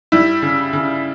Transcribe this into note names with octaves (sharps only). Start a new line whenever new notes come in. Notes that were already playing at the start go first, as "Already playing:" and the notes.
G3 E4
C#3
C#3